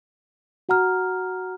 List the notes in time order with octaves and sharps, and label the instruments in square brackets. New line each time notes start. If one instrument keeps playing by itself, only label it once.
[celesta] F#4 F#5 A#5 F6